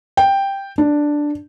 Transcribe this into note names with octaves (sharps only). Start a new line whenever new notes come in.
G5
D4